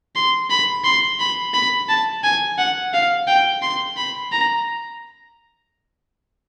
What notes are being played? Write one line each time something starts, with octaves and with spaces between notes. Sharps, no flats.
C6
B5
C6
B5
B5
A5
G#5
F#5
F5
G5
C6
B5
A#5